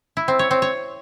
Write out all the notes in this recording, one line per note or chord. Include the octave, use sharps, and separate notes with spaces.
E4
C4
C#5
C4
C#5